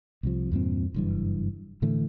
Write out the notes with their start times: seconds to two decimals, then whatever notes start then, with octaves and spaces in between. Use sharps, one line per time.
0.23 C2 C3 F3
0.52 E2 G2 A#2 C4
0.94 F#1 G2 E3
1.82 A2 D3 E3 A3